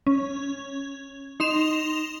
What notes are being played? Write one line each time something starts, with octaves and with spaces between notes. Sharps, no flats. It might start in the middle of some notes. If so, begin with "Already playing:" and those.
C#4
D#4 C6 E7 F7